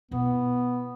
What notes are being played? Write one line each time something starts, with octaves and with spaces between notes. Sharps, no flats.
B2 B3 E4